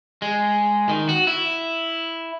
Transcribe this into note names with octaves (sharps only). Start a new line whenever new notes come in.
G#3
D#3
F#4
E4